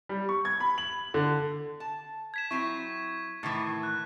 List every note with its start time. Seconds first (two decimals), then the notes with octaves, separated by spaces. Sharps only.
0.09 G3
0.29 C#6
0.45 G#6
0.60 B5
0.78 F#7
1.14 D3
1.80 A5
2.34 G#6 B6 E7
2.51 F#3 C4 E4 C#6 B6
3.43 A2 D#3 E3
3.83 F#6